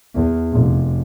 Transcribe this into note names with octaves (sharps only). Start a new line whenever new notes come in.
E2
F1